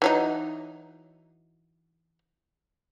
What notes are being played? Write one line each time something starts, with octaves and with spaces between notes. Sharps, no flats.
E3 F#3 D#4